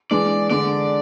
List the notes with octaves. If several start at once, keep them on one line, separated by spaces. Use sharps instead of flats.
E3 G#3 D4 D5
D3 G#3 D4 D5